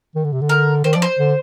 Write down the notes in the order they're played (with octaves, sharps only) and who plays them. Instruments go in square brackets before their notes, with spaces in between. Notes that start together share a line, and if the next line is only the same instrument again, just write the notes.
[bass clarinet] D#3
D3
C3
D3
[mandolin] A#4
[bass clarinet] D#3 [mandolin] C5
[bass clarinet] F3 [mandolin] D5
[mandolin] C5
[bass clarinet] D3